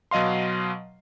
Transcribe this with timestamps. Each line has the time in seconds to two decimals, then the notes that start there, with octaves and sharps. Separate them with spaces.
0.11 B2 F#3 D#5 F5 C6